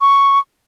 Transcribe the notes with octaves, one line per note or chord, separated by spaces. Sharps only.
C#6